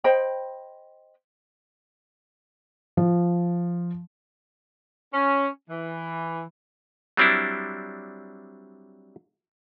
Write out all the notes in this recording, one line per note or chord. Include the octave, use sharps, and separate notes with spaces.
C5 D#5 G5 B5
F3
C#4
E3
F#3 G3 C4 D4 E4